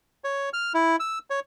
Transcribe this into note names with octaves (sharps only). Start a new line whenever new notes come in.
C#5
F6
E4
E6
C#5